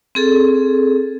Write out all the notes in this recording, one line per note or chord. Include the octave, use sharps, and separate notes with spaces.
C4 G#4 A4